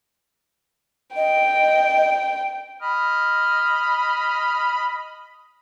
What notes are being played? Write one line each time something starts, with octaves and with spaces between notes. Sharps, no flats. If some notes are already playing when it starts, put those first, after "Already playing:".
D#5 G5
D#5 B5 F6